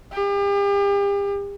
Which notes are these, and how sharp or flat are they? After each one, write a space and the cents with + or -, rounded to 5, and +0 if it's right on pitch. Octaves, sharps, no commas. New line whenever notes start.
G4 +40